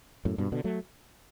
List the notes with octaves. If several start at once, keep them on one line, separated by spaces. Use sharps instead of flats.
F#2 A2
G2 B2
B2 D3
F#3 A3